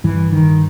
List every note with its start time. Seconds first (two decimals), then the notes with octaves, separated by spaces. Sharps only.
0.04 G2 E3
0.32 D#3